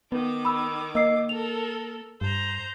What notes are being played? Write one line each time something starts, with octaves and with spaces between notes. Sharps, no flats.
D#3 B3 D6
B5 E6
A#3 D#5 E6 C7
A4 A#4 F7
G2 C5 A#5